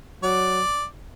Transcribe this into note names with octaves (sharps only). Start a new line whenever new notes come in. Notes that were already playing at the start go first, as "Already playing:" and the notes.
F#3 D5